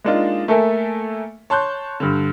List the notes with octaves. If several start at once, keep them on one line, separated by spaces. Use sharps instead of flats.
G#3 A#3 D4 D#4 F4
A3 A#3 A4 A#4 E5 G#5
C#5 A5 C6 F#6 G6
G2 D3